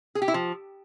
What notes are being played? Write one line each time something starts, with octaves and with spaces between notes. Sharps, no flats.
G#4
G4
E4
F3